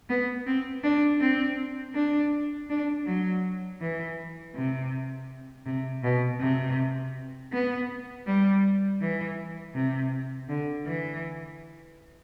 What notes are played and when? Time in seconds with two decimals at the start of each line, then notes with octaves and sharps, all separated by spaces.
0.10 B3
0.46 C4
0.83 D4
1.20 C4
1.95 D4
2.70 D4
3.06 F#3
3.81 E3
4.55 C3
5.66 C3
6.04 B2
6.40 C3
7.52 B3
8.26 G3
9.01 E3
9.75 C3
10.49 D3
10.86 E3